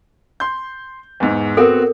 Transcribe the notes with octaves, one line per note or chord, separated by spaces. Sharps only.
C6 G6
E2 G#2
B3 C4 F#4 A4 A#4